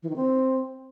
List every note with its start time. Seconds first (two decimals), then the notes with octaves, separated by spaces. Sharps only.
0.03 E3
0.09 D#3
0.16 C4